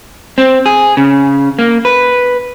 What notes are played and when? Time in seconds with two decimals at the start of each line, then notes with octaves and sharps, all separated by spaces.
0.38 C4
0.66 G#4
0.97 C#3
1.59 A#3
1.85 B4